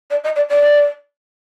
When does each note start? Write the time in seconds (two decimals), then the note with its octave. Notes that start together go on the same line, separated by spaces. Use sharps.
0.11 D5
0.24 D#5
0.36 D5
0.50 D5